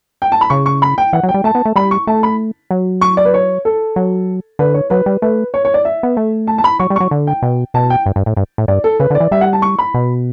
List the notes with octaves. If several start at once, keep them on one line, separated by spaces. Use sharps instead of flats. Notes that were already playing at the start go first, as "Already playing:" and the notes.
G5
A5
B5
C#3 C#6
C#6
B5
G5
E3 F#5
F#3
G5
G3
A3 A5
B3
A3
G3 B5
C#6
A3 A5
B5
F#3
C#6
D5
B4
C#5
A4
F#3
D3 B4
C#5
F#3 B4
G3
A3 B4
C#5
C#5
D5
E5
B3
A3
A5
A5
B5
F#3 C#6
G3
F#3 C#6
D3
G5
B2
B2 A5
G5
G2
G2
A2
G2
A2
G2 D5
A4
C#3 B4
D3
D5
E3
G3 E5
F#5
A5
C#6
B5
B2